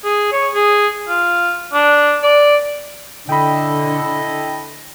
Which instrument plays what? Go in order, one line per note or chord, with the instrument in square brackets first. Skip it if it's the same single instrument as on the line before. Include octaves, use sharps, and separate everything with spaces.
[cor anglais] G#4
C#5
G#4
F4
D4
D5
[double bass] D3 [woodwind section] E4 A4 D#5 [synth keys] G5 B5